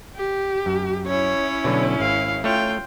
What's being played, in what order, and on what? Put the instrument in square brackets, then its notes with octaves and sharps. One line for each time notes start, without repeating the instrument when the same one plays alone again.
[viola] G4
[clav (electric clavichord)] F#2
[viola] C#4 E4 [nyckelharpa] C#5
[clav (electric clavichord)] B2 D3 F#3
[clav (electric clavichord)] G#1 [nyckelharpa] F5
[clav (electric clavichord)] A3 C#5 [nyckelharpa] F4 G5